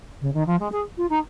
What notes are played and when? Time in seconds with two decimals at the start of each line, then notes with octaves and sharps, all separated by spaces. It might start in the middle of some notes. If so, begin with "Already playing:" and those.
0.21 C#3
0.34 D#3
0.46 F3
0.59 G#3
0.72 G#4
0.97 F4
1.09 D#4